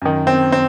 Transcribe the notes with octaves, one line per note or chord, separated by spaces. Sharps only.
F#2 D#3
C4
C4